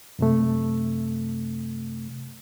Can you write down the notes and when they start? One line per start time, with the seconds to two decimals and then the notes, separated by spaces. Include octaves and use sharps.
0.19 F#2 C3 A3